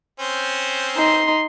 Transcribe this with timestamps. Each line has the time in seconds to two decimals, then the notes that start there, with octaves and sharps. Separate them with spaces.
0.20 C4 C#4 C5
0.96 D#4 C6